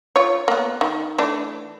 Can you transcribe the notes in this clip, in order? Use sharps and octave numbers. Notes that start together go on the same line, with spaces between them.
F4 C#5
A#3 B3
D#3
E3 A3 D4